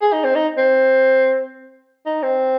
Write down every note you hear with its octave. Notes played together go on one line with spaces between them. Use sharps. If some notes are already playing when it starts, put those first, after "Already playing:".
G#4
D#4
C4
D#4
C4
D#4
C4